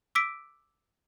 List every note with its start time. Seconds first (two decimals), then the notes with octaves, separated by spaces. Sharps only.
0.15 D6 E6 B6 D7